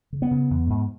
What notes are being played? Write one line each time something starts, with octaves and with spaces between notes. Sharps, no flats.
C#3
B3
C#3
E2
G#2